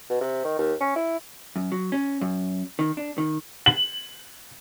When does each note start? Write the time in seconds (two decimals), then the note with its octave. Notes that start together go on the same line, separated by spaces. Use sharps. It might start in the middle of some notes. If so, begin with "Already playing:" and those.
0.09 B2
0.21 C3
0.44 D#3
0.58 D#2
0.80 C#4
0.96 E4
1.56 F#2
1.72 F#3
1.92 C#4
2.21 F#2
2.79 D#3
2.97 D4
3.18 D#3
3.66 F#7